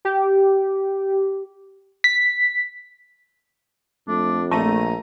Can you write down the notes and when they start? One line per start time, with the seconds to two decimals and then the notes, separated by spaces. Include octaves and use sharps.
0.05 G4
2.04 B6
4.08 F2 A3 D4
4.51 A#1 A3 A#5 D#7